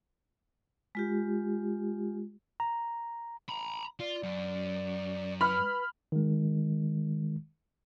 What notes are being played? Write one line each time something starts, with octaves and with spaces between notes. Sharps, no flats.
G#3 F4 G4
A#5
A#5 B5
F4 D5
F#2
B4 B5 F6
D#3 G#3